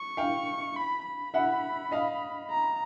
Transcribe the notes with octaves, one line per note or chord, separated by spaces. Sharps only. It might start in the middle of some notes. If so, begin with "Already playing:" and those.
Already playing: C#6
F5 G5
B5
B5
E5 F#5
D#5 F5
A#5